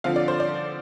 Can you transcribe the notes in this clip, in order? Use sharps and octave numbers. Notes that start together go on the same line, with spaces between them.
D3 F3 C4 F5
D5
C5
D5